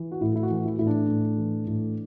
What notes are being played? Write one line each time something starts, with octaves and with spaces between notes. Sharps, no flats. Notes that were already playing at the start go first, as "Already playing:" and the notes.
Already playing: E3
F#4
A2 E4
E4
F#4
E3
E4
A2 E4
D4
A2
E3
A2